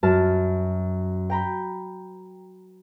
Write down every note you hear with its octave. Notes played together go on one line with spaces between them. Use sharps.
F#2 A5 F6
G5 A#5 B5